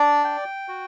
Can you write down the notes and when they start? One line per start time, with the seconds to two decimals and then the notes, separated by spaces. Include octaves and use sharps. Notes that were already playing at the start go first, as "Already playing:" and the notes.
Already playing: D4 D5
0.24 G5
0.68 F#4